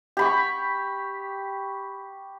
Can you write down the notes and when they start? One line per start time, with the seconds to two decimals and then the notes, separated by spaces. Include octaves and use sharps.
0.17 G4 B5 C#6